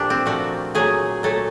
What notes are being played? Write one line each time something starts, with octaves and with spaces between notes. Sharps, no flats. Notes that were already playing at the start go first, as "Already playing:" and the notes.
Already playing: A#2 F3 A3 D4 G4
C4
A#2 F3 A3 F#4
A#2 F#3 A3 G#4
A#2 F#3 A3 A4